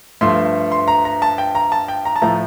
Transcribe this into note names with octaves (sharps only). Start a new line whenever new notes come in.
G2 F3 A3 C6
C6
A#5
A#5
A5
G5
A#5
A5
G5
A#5
A5
A2 F3 A3 A#5